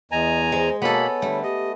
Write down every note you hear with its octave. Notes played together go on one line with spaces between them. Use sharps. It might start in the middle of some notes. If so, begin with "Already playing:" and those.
E2 D#5 G#5 A#5
G#3 C5
B2 A#3 B3 A4 C#5 B5
D3 G3 A3
G4 D#5